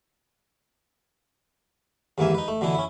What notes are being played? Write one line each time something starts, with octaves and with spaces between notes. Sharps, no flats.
D#2 G#2 E3 A#3 E5 G#5
D#4 B4
A3
B2 D3 E3 B3 E4 A4
C#4 E4